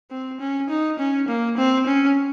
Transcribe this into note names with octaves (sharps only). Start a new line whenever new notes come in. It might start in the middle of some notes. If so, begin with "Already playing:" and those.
C4
C#4
D#4
C#4
A#3
C4
C#4